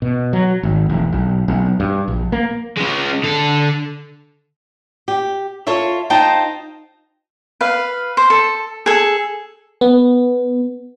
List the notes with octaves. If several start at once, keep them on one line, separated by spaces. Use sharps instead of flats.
B2
F#3
G#1
E1
B1
B1
G2
A#1
A#3
G#3 C#4
D3 A4
G4
F4 A4 C#5 E5
D#4 F4 C5 G5 A5
B4 F5
C5
A4
G#4 A4
B3